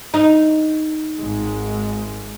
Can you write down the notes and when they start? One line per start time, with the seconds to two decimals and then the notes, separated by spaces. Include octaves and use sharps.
0.14 D#4
1.17 G#1 G#2 G#3